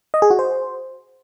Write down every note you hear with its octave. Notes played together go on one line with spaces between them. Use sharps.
D#5
G#4
F#4
C5